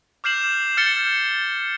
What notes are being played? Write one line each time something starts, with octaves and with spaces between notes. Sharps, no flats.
D6 F6 G6 C7 E7 F#7
F6 G6 A6 C#7 G7